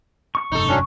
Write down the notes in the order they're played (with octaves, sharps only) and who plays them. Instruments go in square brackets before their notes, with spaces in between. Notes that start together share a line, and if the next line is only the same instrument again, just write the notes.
[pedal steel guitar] C#6
[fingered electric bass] F1 G2 C3 [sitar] D#4 A4
[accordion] F#3 C#4 D4